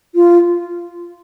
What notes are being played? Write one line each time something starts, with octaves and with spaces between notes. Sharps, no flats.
F4